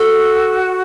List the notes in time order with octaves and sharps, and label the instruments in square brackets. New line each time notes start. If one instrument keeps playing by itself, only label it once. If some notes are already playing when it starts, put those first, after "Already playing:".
Already playing: [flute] F#4 [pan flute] A4